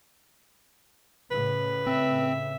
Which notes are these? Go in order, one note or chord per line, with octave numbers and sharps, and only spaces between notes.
A2 C#3 B4
C4 E5